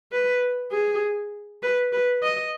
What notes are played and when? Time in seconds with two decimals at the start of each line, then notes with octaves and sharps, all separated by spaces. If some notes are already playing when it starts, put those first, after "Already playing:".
0.12 B4
0.72 G#4
1.63 B4
1.93 B4
2.23 D#5